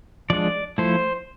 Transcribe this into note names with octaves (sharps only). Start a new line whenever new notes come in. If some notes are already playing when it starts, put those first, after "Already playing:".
F3 G#3 D4 D5
F3 A3 E4 C5